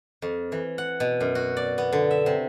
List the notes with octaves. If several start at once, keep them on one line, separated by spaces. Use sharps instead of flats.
F2
E3
F#5
B2
F#2
F#4
D5
B3
D3
E5
C3